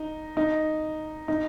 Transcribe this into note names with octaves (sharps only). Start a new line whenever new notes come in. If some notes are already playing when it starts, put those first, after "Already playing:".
Already playing: D#4
D#4
D#4